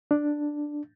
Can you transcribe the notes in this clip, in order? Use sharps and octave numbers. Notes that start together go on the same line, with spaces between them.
D4